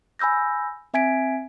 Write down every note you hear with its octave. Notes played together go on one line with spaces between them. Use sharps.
G#5 B5 E6 G6 A#6
C4 E5 G#5 G#6 B6 D7